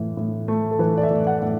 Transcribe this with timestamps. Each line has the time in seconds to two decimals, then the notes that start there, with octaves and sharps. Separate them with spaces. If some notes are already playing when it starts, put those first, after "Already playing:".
Already playing: A2 E3
0.17 A2
0.48 A3
0.71 A4
0.79 E3 B4
0.98 D5
1.03 E5
1.11 A2
1.27 F#5
1.42 A2